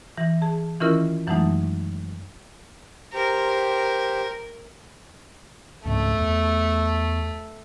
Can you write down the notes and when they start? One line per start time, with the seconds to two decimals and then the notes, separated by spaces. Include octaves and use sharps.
0.17 E3 A#6
0.42 G#4 A5
0.80 D#3 E3 C#4 E4 F4 A#4
1.27 F#2 E3 F#3 G#3 A3 D#4
3.14 G4 A#4 C5
5.85 C#2 G#2 A3 C4
6.18 E2